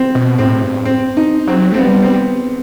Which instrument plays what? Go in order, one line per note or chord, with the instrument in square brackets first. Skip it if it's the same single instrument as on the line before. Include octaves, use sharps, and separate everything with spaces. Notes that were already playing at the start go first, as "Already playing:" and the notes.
Already playing: [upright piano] C4
[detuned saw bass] B2
[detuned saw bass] A2 [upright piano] C4
[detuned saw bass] G2
[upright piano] C4
D#4
[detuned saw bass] F#3 [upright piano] C4
[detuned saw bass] A3 [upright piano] C4
[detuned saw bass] G3 [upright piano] B3
[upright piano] C4